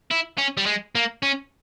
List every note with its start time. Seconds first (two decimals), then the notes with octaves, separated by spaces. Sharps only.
0.11 E4
0.38 C#4
0.57 G3
0.66 G#3
0.95 A#3
1.23 C#4